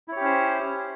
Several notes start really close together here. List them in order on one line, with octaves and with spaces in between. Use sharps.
E4 C#5 G4 C#4 C5